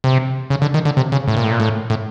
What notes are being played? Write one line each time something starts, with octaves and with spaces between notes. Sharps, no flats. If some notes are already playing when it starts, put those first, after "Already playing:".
C3
C#3
D3
D#3
D3
C3
C#3
A2
A#2
A2
A#2
A2
A2